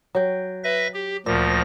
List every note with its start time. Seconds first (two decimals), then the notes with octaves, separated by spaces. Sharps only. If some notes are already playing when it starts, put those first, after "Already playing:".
0.15 F#3 G5
0.64 B4 E5 A#6
0.94 G4
1.26 D2 A#2 F3 A#6